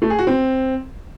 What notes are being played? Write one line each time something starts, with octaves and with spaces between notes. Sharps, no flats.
A3
G#4
F#4
C4